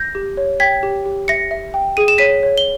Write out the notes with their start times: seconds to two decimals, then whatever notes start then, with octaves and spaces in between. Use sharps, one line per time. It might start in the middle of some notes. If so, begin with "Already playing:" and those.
Already playing: G6 A#6
0.15 G4
0.37 C#5
0.60 G5 G#6 B6
0.83 G4
1.06 G4
1.28 E5 A#6 C#7
1.51 E5
1.74 G5
1.97 G#4 D#7
2.08 E7
2.18 C#5 B6 D#7
2.43 C#5
2.58 G7